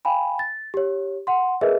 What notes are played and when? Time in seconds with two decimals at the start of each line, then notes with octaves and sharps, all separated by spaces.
0.05 F5 G5 G#5 B5
0.39 A6
0.74 G4 C#5
1.27 F#5 C6
1.61 G#4 A#4 B4 D#5 E5